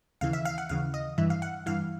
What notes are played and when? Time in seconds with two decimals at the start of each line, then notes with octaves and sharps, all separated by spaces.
0.21 D#2 C#3 E3 F5
0.33 E5
0.45 F5
0.58 F#5
0.69 D#2 C#3 E3 F5
0.94 D#5
1.18 G2 E3 E5
1.30 F5
1.42 F#5
1.66 G2 E3 F5